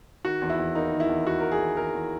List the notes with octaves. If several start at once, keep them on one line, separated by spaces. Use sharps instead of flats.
D#3 F#4
E2
E4
E2
A#3 D#4
D#3
E4
E2
E2 F#4
A#3 A#4
G#4
D#3
E2 A#4
E2